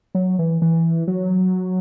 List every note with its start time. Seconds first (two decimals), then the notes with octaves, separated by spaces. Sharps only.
0.15 F#3
0.39 E3
0.62 E3
1.08 F#3